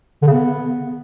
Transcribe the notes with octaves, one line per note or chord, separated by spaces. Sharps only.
D3
C#3
B3